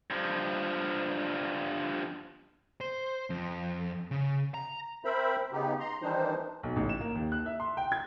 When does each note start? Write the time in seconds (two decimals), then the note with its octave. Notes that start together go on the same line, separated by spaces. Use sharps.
0.10 G2 F3
2.81 C5
3.30 F2
4.11 C#3
4.54 A#5
5.05 C4 A#4 C5 E5 B5
5.52 C#3 B3 D#4 G4
5.80 A#5 C6
6.02 D#3 E3 G3 D4 D#4 C5
6.63 B1
6.76 A1
6.89 E7
7.01 A#3
7.15 D#2
7.32 F#6
7.46 E5
7.60 C6
7.77 G5
7.92 G#6